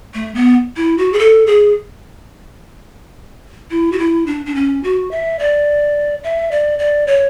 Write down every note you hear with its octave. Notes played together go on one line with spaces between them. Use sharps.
A3
B3
E4
F#4
G#4
A4
G#4
E4
F#4
E4
D4
D4
C#4
F#4
E5
D5
E5
D5
D5
C#5